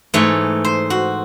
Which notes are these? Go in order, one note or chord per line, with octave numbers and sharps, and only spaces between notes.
G#2 E3 A3 C#5
C5
F#4